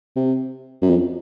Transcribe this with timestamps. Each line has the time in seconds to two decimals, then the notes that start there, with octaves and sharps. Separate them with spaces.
0.16 C3
0.82 F#2
0.90 F2